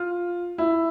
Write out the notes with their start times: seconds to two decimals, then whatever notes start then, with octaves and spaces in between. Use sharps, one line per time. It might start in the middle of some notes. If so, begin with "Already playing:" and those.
Already playing: F4
0.58 E4